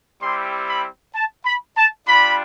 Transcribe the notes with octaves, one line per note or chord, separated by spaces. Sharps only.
G3 C4 E4 G4 C6
B5
A5
B5
A5
G3 D4 F4 B5